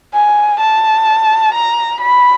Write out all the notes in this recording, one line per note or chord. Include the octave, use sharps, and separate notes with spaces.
G#5
A5
A#5
B5